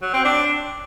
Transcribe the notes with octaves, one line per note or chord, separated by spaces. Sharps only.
F#3
C4
D4